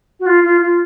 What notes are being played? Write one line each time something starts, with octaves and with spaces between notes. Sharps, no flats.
F#4
F4
F4
F4